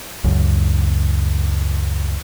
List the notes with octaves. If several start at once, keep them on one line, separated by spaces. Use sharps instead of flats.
C#2 F#2